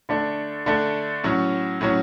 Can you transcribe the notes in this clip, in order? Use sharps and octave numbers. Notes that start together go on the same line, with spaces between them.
D3 A3 D4
D3 A3 D4
A2 F#3 C#4
A2 F#3 C#4